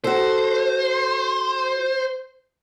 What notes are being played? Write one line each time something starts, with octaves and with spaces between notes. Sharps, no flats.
F#4 A4 C5